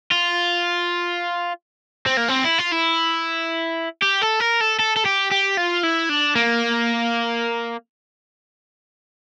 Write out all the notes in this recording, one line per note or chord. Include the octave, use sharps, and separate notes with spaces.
F4
C4
A#3
C4
E4
F4
E4
G4
A4
A#4
A4
A4
A4
G4
G4
F4
E4
D4
A#3